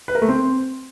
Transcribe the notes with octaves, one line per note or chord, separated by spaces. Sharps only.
B4
A#4
A3
C4